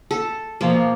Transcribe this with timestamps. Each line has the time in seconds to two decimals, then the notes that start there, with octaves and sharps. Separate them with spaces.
0.11 A4
0.61 B2 F3 A#3